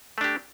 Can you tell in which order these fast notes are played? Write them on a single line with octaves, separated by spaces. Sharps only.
A3 D4 G4